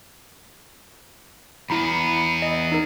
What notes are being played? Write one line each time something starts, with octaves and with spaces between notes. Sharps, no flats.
E2 B3 E4 A#5 B5
D#5
D#4 A#4